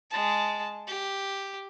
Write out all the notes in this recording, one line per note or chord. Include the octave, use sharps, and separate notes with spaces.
G#3 A5
G4